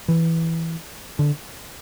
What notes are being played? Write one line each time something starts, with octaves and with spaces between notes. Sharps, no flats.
E3
D3